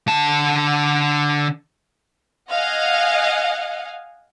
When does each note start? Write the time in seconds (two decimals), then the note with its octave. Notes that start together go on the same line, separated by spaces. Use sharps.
0.08 D3 A5
2.50 D#5 F5 F#5 G#5